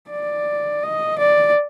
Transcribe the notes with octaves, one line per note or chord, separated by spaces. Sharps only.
D5
D#5
D5